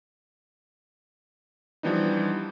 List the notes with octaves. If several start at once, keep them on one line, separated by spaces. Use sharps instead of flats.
E3 F3 G3 B3 D4 D#4